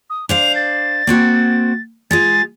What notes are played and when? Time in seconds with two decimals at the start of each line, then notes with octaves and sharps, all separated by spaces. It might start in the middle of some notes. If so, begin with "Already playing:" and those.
0.10 D#6
0.29 D4 C5 F5 F7
0.56 A6
1.07 A#3 C4 F#4
2.11 G#3 F4 G#4 A6